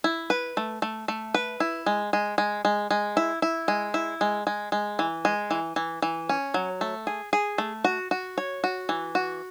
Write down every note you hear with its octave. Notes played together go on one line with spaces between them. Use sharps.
E4
B4
A3
A3
A3
B4
E4
G#3
G#3
G#3
G#3
G#3
E4
E4
G#3
E4
G#3
G#3
G#3
E3
G#3
E3
E3
E3
C#4
F#3
A3
G#4
G#4
A3
F#4
F#4
C#5
F#4
E3
F#4